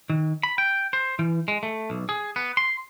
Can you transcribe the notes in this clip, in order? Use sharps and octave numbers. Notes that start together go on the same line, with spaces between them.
D#3
B5
G5
C5
E3
G#3
A3
B1
G#4
B3
C6